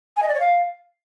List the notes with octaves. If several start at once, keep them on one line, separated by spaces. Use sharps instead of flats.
G#5
D#5
D5
C#5
F5